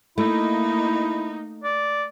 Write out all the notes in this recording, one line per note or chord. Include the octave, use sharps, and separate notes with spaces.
A3 A#3 D#4 E4
D5